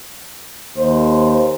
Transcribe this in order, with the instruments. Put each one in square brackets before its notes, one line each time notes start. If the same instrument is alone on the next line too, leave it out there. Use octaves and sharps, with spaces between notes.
[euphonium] D#2 [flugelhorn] C5